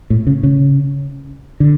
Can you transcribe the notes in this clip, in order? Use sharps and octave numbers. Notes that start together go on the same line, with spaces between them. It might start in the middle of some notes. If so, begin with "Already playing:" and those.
A2
C#3
C#3
D3